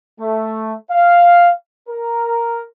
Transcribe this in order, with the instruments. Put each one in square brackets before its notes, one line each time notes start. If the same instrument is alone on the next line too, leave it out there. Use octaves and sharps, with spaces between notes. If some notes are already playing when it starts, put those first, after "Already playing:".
[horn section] A3
F5
A#4